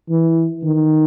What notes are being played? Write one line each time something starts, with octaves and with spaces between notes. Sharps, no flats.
E3
D#3